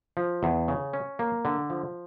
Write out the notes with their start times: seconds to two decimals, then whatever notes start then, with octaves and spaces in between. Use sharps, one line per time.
0.17 F3
0.43 E2
0.68 C#3
0.93 C#4
1.19 A#3
1.45 D3
1.70 F3